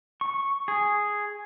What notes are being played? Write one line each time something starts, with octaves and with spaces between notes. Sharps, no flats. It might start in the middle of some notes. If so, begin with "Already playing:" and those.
C#6
G#4